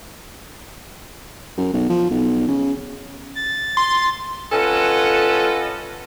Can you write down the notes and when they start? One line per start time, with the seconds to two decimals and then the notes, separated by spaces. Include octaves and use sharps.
1.57 F#2
1.73 B1
1.89 F3
2.10 B1
2.48 C#3
3.35 A6
3.77 C6
4.52 C#4 F4 A4 B4 D#5 F#5